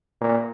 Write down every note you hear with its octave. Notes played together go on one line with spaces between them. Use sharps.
A#2